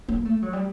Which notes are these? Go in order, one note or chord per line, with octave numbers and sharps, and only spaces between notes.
A#3
A3
F#3
G3